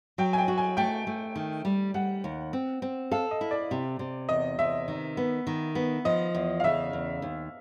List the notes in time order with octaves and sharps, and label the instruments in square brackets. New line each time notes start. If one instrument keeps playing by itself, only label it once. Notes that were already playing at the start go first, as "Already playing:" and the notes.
[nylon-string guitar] F#3 [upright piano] G5
[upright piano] G#5
G5
[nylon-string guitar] F#4
[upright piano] G#5
[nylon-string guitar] A3 [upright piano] G5
[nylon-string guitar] A3
D#3
G3
[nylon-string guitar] G3 [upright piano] F#5
[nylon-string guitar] D#2
C4
C4
[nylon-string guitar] A4 [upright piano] F5
[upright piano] D#5
[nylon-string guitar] E4
[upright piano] D5
[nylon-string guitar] C3
C3
[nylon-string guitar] E2 [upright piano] D#5
[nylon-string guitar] C3 [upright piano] E5
[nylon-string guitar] D#3
B3
D#3
B3
[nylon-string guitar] F3 [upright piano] D#5
[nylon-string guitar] E2
[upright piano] F5
[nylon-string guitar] C#3 [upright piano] E5
[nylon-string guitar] E2
D#2